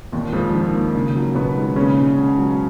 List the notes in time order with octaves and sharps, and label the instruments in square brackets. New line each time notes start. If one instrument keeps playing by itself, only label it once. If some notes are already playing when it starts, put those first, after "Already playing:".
[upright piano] D#2 D#3 [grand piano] A#2
[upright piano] F2 F3 [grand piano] G#3
[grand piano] D#3
A#3
C#3
F#3
[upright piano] B2 B3 [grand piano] D#3
[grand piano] G#3
[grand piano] A#2 [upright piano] C#3 C#4
[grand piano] G#3
B2
F#3